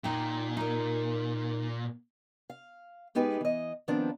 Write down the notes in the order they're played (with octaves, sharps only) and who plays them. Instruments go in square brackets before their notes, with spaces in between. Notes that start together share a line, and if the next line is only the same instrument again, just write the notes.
[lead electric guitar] A#2 [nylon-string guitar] D#4 G5
[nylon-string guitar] D#4 A#4
[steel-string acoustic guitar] F5
G#3 B3 D#4 G4 G#4 B4
E3 D#5
D#3 F3 B3 C4 D4